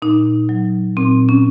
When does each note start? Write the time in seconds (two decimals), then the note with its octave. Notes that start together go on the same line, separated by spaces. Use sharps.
0.02 A#2 D#4
0.49 F#3
0.97 A#2 C4
1.29 C#4